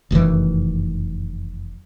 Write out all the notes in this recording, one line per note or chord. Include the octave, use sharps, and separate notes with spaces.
F1 F#2 D#3 E3